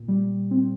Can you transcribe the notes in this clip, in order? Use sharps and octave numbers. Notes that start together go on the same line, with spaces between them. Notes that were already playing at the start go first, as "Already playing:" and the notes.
Already playing: A#2
G3
C4